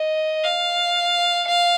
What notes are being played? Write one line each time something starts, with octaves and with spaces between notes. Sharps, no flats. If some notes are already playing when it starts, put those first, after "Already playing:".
Already playing: D#5
F5
F5